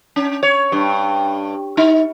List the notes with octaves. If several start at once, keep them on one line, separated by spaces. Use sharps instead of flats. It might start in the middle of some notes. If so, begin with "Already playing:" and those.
C#4
C#5
G2
D#4